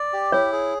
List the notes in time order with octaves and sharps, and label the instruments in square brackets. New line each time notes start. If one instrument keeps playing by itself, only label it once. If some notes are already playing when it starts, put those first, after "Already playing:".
Already playing: [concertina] D5
G4
[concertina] E4 [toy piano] C#5
[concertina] G#4